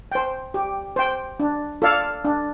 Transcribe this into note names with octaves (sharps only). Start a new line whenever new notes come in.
C5 G5
G4
C5 G5
D4
F4 A4 D5 F5
D4